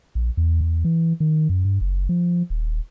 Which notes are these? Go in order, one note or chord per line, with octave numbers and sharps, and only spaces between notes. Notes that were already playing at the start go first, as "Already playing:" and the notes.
A#1
E2
E2
E3
D#3
F#2
G2
F#1
F3
D#1